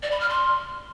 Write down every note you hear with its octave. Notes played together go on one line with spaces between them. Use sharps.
D5
B5
F6
C6